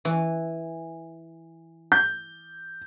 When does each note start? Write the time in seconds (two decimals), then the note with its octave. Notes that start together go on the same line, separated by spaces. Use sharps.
0.05 E3
1.92 G6